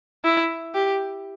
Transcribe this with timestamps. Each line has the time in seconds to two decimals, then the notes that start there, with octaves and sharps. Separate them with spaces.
0.25 E4
0.75 G4